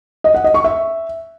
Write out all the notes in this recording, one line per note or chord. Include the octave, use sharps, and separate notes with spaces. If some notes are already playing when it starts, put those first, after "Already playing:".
D#5
F#5
D#5
C#6
E5